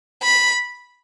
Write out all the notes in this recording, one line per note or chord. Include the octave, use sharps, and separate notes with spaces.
B5